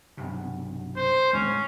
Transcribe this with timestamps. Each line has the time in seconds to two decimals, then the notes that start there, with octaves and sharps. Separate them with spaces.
0.17 B1 G2 C3
0.96 C5
1.33 D1 A2 G#3 C#4